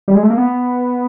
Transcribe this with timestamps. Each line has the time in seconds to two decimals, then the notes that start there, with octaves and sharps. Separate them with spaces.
0.08 G3
0.15 G#3
0.23 A3
0.30 A#3
0.38 B3